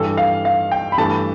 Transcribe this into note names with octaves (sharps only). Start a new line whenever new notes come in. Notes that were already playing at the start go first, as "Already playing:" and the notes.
Already playing: G2 E3 G3 A4
F5
F5
G5
B5
G2 E3 A3 A5